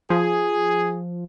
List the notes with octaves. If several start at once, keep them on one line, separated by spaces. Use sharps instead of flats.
F3 G#4